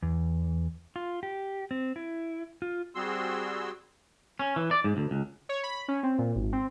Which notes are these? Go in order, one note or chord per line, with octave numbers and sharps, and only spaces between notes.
E2
F4
G4
C4
E4
F4
G3 C4 F#4 G#4 C6 E6
C#4
E3
D5
G#2
D2
C#2
C#5
B5
C#4
C4
A#2
G#1
C4